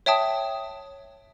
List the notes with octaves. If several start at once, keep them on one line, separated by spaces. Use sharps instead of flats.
C#5 E5 G5 A5 D#6